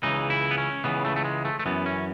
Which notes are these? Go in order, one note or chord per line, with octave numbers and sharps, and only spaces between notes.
C#2 C#3 E3 D#4
E4
B3
C#4
C#2 C#3 E3 B3
A3
A3
G#3
A3
A3
F#2 E3 B3
C#4